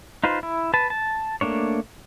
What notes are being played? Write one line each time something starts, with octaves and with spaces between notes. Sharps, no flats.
D#4 F4 B4 C5
E4
B4 A5
A5
A3 A#3 D4 C#5